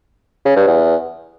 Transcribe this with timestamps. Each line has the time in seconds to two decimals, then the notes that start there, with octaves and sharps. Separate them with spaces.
0.45 C#3
0.56 G2
0.67 E2